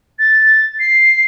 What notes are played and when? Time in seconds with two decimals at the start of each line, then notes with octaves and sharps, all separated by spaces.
0.19 A6
0.80 C7